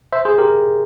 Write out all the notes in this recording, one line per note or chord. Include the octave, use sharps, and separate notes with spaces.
C5 E5
G#4 C5
G4 A#4